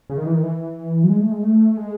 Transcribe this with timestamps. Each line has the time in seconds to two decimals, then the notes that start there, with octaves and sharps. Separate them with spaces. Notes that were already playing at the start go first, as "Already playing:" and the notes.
0.10 C#3
0.18 D#3
0.26 E3
0.34 D#3
0.43 E3
1.04 F#3
1.09 G#3
1.21 A3
1.32 G#3
1.43 A3
1.77 G#3